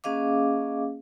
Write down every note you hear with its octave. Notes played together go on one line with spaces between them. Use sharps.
A#3 C#4 G#4 D#5 F5 D6